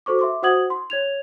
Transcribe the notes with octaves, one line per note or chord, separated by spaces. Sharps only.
F#4 A4 C5 C#6 D6
E5 C6 D6
F#4 C5 F#5 D#6 G#6 F#7
C6
C#5 G#6 F7